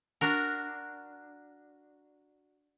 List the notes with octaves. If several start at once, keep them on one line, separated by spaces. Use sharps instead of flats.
D4 F#4 A#4